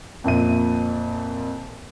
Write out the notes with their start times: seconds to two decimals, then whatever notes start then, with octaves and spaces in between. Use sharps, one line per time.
0.24 F2 A#2 E5 D#7